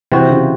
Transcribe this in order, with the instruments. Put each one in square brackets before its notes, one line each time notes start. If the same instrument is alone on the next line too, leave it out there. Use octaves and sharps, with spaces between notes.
[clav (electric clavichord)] C3 E3 C4 F#4 C5
[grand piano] C#3